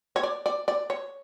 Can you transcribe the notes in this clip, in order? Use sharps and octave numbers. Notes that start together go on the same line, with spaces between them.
C#5
D5
D5
D5
C#5